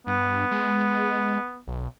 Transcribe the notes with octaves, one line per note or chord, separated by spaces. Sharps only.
G2 B3
G#3
B1